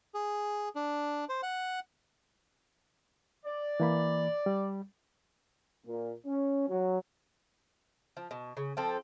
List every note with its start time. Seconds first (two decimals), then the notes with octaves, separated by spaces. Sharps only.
0.14 G#4
0.76 D4
1.29 C5
1.43 F#5
3.45 D5
3.80 E3 A#3 B5
4.46 G3
5.87 A#2
6.26 C#4
6.69 F#3
8.17 F3
8.31 B2
8.57 C#3
8.77 F3 C4 A4